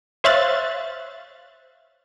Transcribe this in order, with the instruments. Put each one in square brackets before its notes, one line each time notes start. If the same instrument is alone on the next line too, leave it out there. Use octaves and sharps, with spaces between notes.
[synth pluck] C5 C#5 E5 F5 F#6 A6